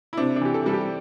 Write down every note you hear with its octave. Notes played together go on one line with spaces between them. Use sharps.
E4
C3 D4
D4
E3 G4
A4
G3 A4
G4